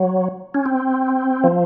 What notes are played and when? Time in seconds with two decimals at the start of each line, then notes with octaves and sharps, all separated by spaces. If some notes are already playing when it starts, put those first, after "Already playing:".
Already playing: F#3
0.54 C#4
0.66 C4
1.44 F3